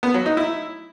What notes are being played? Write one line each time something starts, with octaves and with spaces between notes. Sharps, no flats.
B3
F#3
D#4
E4